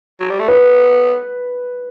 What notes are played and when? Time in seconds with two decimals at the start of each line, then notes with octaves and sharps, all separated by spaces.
0.20 F#3
0.30 G3
0.39 A3
0.48 B3 B4